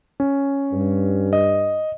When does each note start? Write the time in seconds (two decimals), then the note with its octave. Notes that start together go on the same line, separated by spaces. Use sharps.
0.20 C#4
0.73 G2
1.33 D#5